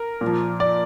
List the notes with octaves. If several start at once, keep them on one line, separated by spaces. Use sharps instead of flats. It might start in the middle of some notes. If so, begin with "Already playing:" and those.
Already playing: A#4
A#2
F3
D5